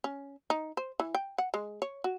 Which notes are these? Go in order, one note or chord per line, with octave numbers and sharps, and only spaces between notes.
C#4
D#4
C5
E3
G5
F#5
G#3
C#5
F#4